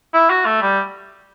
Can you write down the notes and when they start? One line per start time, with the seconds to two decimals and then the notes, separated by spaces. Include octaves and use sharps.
0.14 E4
0.30 F#4
0.45 A3
0.62 G3